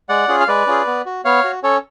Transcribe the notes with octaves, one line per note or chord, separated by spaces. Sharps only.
G#3 D5 F#5
C#4 F4 G#4
F5
G#3 B4 D5
C#4 F4 G#4
B3
F#4
B3 C#5 F5
F#4
C#4 A4 C#5